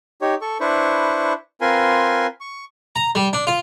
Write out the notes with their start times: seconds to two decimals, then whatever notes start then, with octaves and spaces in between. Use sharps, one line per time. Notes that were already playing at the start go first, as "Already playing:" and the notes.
0.21 D#4 G4 C#5
0.41 A4 C#6
0.60 D4 E4 B4 C5 C#6
1.61 C4 F4 A#4 B4 G#5 C6
2.41 C#6
2.96 A#5
3.15 G3
3.33 D4
3.47 F4